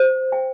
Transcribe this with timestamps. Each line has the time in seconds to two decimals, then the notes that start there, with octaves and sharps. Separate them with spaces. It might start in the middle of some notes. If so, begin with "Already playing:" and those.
Already playing: C5
0.32 G5